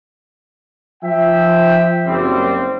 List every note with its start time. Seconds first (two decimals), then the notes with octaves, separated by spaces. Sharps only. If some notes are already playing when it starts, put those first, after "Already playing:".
1.04 F3 E5 G5
2.06 F#1 G3 C4